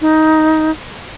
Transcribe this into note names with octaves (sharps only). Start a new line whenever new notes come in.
D#4